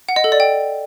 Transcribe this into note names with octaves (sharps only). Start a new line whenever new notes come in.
F#5
D#5
A4
D5
G5